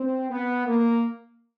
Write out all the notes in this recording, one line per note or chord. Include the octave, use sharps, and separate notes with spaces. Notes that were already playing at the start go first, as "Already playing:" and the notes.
Already playing: C4
B3
A#3